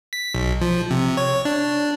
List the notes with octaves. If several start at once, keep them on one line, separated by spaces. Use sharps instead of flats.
B6
B1
F3
C3
C#5
D4